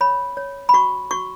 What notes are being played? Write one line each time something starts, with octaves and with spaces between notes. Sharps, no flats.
C#5 B5
C#5
B5
F#4 C#6
F#4 C#6